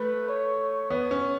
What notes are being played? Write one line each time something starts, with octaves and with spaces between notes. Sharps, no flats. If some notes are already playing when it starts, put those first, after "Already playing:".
Already playing: A3 B4
C#5
B3 C#5
C#4